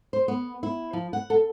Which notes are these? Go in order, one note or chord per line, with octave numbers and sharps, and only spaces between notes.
C5
B3
E4
F3
F#5
A4